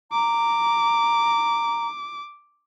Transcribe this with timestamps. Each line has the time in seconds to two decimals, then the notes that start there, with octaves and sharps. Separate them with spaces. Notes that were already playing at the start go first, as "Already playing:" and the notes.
0.12 A#5 D6